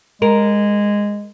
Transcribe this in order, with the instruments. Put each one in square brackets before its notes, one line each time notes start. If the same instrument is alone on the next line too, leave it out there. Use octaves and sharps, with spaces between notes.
[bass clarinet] G#3 [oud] A#4